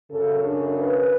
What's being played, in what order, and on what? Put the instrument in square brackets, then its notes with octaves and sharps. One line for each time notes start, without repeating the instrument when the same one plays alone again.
[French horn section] F#2 C#3 A4
D4
B4